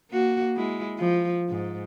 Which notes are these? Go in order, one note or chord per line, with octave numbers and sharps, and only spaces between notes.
A#3 F#4
G#3 E4
F3
G#2